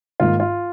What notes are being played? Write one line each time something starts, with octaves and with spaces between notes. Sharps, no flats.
G#2 D#3 A#3 F4
F4